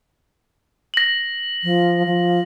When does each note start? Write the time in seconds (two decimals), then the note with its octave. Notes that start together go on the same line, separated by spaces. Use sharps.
0.94 A#6 F#7
1.64 F3
2.06 F3